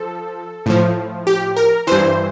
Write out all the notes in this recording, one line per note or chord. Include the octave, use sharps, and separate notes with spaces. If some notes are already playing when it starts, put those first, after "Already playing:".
Already playing: F3 A4
A2 F3
G4
A#4
G2 E3 C5